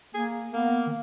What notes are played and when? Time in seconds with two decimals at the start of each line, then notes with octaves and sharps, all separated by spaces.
0.15 A#3 G#4
0.53 A#3 B3
0.87 D#3